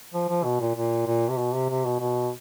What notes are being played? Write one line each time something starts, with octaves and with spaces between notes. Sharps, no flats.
F3
F3
B2
A#2
A#2
A#2
C3
B2
C3
C3
B2
B2